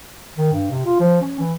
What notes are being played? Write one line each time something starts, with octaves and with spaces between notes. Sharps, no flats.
D#3
G2
C3
F4
F3
C#4
E3